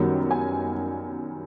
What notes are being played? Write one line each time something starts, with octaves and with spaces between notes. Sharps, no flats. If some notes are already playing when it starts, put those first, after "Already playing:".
Already playing: F#2 D#3 G3 B3
G#5